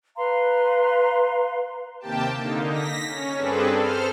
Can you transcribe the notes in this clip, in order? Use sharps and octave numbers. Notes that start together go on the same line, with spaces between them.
B4 F5 A#5 C6
D#2 C3 A#3 G4 G5 A5
D3 A#3 D#4
A#6 B6
C#4
G2 C4 D4 G#4 A4 B4
A4 C5 F6